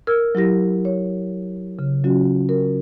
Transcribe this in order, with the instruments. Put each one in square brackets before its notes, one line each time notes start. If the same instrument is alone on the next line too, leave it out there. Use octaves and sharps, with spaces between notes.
[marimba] A#4 E6 F6 G#6
F#3 E4 G4 A#6
C#5
C#3
F#3 C#4 F4 F#4
A#4